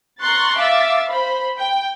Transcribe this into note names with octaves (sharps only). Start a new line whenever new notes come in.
A#5 C6 C#6 F#6 A6
E5 F5 D6 A6
C5 B5
G5